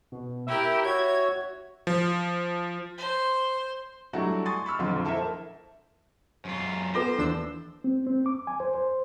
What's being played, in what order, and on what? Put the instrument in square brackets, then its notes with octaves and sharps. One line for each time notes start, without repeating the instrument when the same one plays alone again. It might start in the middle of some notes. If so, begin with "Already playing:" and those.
[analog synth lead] B2
[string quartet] E4 G4 A#4 [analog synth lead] E5
[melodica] F#4 C#5 [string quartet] G#6
[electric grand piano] F3
[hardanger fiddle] C5
[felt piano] F#3 G3 A3 D4 E4 F#4
G#5 C6 C#6 D#6 A6
B5 C#6 E6 F6
D#1 B1 F2 D3 F4 C6
E4 A4 A#4 C5 E5
[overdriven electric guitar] F#2 F4
[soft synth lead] B3 [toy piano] F4 A4 B4 [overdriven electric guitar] C5
[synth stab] D#2 D4 E6 [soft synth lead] E3
[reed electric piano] C4
C4
D6
G#5
C5
C5